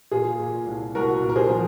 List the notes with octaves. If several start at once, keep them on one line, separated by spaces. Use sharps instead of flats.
A#2 F4 G#4
A#2
C2
C2 F#4 A#4
A#2
A#4
G#4 C5
F3